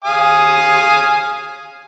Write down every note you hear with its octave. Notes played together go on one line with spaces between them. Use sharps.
F5 G#5 D#6